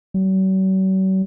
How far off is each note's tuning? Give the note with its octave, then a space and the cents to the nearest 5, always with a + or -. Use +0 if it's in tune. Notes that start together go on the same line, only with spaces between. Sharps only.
F#3 +45